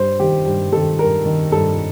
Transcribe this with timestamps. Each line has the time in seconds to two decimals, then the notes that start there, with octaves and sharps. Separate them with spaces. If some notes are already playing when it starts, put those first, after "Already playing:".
Already playing: G2 C5
0.19 D#3 G4
0.45 G2
0.72 D#3 A4
0.99 G2 A#4
1.25 D#3
1.52 G2 A4